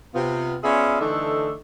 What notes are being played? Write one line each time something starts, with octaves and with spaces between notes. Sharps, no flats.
C3 B3 F4
B3 C#4 F4 G#4 D5 E5
D3 E3 A3 D4 D#4 A4